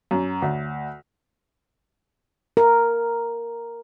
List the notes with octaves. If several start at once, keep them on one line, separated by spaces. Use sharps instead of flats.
F#2
D2
A#4